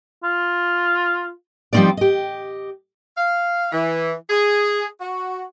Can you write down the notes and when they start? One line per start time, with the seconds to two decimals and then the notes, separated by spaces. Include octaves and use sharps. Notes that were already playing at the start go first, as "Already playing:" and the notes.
0.24 F4
1.73 F3 G3 C4 C#4 D#4 D5
1.97 G4 D#5
3.18 F5
3.72 E3
4.30 G#4
5.01 F#4